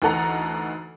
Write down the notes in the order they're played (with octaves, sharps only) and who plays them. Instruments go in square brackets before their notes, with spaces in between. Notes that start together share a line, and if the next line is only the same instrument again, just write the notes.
[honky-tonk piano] D2 E3 D#4 A4 F#5 A#5